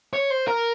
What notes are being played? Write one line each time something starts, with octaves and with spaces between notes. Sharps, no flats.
C#5
C5
A#4